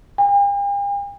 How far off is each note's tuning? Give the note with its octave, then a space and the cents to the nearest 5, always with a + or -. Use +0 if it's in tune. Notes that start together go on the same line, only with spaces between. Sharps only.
G5 +45